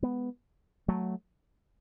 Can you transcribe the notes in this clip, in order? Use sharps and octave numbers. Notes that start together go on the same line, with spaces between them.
G#3 B3
F#3 A3